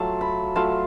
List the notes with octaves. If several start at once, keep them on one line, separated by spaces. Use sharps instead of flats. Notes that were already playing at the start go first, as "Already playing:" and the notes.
Already playing: F#3 A3 F4 A5
B5
F#3 A3 F4 A5